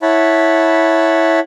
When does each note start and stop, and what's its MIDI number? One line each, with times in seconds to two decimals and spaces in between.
0.02 1.40 64
0.02 1.40 73
0.02 1.40 78
0.02 1.40 81
0.02 1.40 83